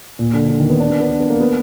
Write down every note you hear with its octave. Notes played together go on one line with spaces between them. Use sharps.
A#2
D3
D3
D#3
B3
D4
B3
B3
D4
B3
A#3
B3